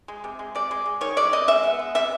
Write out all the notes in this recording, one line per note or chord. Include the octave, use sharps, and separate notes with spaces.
G#3
C3
G#3
C3 D5
G#3
G#3
D#3 C#5
G#3 D5
C3 D#5
G#3 E5
B3
G#3
C3 E5